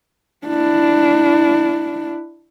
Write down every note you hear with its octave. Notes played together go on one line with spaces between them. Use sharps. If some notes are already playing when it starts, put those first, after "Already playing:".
D4 E4